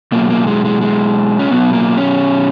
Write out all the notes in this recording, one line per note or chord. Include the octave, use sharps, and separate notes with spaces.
B2 F#3 A#3
A#3
G#3
G#3
G#3
C#4
B2 F#3 B3
A#3
C#4